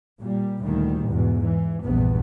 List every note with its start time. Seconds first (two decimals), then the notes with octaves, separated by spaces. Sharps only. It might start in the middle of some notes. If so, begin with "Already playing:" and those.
0.20 A#2 G3
0.64 D2 A#2 D#3 G3
1.07 E2 G#2 B2
1.44 E3
1.83 A#1 E2 G2 B3